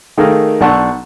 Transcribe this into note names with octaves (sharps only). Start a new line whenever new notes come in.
D#3 A3 G#4 A#4 F5 G5
B1 D4 F#5 A5 C#6 E6